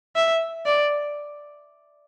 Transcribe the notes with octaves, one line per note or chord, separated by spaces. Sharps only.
E5
D5